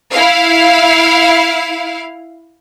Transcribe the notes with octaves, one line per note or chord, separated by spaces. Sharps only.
E4 F5